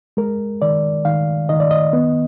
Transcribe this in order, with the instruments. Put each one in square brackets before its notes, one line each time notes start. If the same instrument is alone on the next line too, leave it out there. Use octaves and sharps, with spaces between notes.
[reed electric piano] G#3 A#4
D#3 D5
D#3 F5
D#3 D#5
D5
D#5
B3